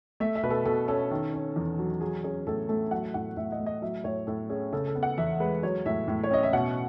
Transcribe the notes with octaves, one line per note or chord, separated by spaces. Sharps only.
A3 E5
E5
B2 B4
A4
B2 A4
C#4 A4
D#3
C#4
E2
F#3
F#3 G#4
C#4 G#4
A2 A4
A3 A4
F#3 F#5
A2 F#5
A2 E5
D#5
A3
D#5
F#3 E5
A2 C#5
A2 A4
C#4 G#4
C#3 A4
A4
B3
F#5
E2 E5
G#3 B4
F#3 C#5
A2 E5
A2
C#5
C#4 D#5
E5
B2 F#5